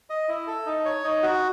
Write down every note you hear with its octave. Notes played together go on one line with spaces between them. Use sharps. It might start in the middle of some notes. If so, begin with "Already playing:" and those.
D#5
E4
A4
D#4
C#5
D#4
F#4